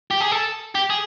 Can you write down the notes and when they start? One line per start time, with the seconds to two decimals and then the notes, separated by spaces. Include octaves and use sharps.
0.11 G4
0.21 G#4
0.32 A4
0.75 G4
0.90 G#4